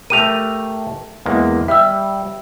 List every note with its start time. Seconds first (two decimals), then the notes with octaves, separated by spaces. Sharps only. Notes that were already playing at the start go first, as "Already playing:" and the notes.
0.10 A3 G4 A#4 D#7 F7
1.26 E2 G#3 A#3
1.68 G3 E5 E6